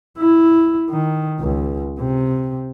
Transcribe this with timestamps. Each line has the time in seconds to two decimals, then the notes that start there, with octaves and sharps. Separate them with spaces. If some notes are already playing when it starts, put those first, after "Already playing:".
0.18 E4
0.90 D#3
1.40 C#2
2.00 C3